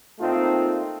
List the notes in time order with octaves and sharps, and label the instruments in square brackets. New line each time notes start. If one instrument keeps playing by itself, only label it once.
[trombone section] A#2 A3 C4 D#4 F4